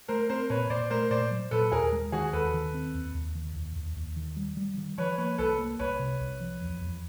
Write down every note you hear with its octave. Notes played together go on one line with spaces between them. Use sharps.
A3 A#4 C5
C4 A#4 C5
A#2 B4 C#5
A#2 C5 D5
A3 A#4 C5
A#2 C5 D5
F#3
A#2 A4 B4
D#2 G#4 A#4
G#3
D#3 F#4 G#4
D#2 A4 B4
D#3
C4
D#2
D#2
D#3
D#2
D#2
D#2
D#3
G3
G3
D#3
F3 B4 C#5
A#3 B4 C#5
C2 A4 B4
A#3
C2 B4 C#5
C3
C2
F3
E2
E2